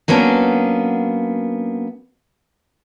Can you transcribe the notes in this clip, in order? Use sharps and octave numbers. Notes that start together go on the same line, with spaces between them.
F#3 A#3 B3 C#4 D4